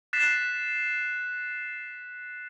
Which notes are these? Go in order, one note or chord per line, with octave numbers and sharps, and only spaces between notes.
F#6 A6 B6 C7 E7